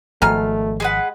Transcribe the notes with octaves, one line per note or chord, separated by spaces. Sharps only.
G#1 B2 F3 A3 G#5 A#5 F6
G#3 G#4 B4 F#5